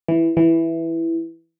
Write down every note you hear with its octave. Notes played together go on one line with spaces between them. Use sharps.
E3
E3